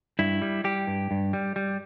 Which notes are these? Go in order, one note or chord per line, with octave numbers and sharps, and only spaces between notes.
G2 E4
G3
G3 G4
G2
G2
G3
G3